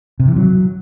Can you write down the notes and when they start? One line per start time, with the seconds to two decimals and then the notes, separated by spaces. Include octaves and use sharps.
0.20 C3
0.28 E3
0.36 F#3